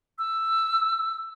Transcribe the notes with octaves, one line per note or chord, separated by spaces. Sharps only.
E6